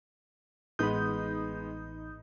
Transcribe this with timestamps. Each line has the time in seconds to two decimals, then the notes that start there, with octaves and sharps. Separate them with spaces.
0.79 A1 G#3 B3 D#4 B5 D#6 G6